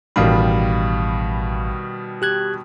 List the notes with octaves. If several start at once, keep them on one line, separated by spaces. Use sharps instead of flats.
A1 B2 D#3 G3 F5 B5
G4 F#6 G#6